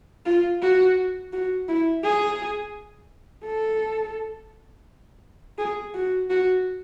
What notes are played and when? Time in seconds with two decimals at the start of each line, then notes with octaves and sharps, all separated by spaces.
0.26 F4
0.62 F#4
1.33 F#4
1.69 E4
2.04 G#4
3.45 A4
5.58 G#4
5.94 F#4
6.30 F#4